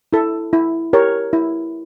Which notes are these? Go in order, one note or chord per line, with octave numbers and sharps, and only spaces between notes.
E4 A4
E4
G4 A#4 C#5
E4